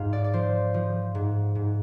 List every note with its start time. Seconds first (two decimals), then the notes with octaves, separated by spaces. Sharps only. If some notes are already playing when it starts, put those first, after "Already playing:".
Already playing: G#2 F3 F5
0.13 D5
0.24 D5
0.33 F3 C5
0.74 F3
1.15 G#2
1.55 G#2